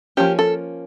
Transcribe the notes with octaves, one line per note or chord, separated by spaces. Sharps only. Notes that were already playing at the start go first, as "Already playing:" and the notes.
F3 A#3 C#4 G4
A4